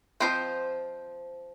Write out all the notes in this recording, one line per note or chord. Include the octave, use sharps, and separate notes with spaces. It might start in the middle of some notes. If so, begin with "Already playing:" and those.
F3 C4 F4 C5 D#5